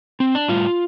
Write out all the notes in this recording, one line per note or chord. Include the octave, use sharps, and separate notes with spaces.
C4
D4
A2 G3 F4